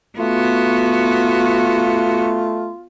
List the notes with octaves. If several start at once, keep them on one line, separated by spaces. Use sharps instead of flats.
A3 B3 F4 F#4